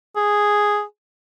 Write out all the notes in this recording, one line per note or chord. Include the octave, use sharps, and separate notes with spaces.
G#4